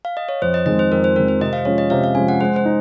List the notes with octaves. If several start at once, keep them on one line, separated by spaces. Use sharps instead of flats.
F5
D#5
C#5
F2 C5
D#5
D#3 G#3 C4 D#5
C5
F2 A#4
C5
D#3 G#3 C4 A#4
C5
C3 D#5
F5
F3 G#3 C#4 C#5
D#5
C3 F5
F5
F3 G#3 C#4 G#5
F#5
G#3 C5
C5
D#4